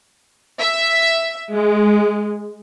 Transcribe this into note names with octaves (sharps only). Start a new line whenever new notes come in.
E5
G#3